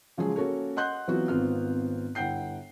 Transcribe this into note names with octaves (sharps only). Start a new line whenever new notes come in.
C#3 F3 F#3 G#3 G#4
A#3 C#4 F#4 A4 A#4 C#5
D#5 F#5 C6 F#6 G6
E3 F#3 B3 C4 F4 F#4
G#1 B3 C4 F4 F6
G1 E4 F#5 G5 G6 C7